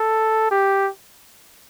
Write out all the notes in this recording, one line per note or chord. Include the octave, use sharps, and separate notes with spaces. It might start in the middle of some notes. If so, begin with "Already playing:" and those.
Already playing: A4
G4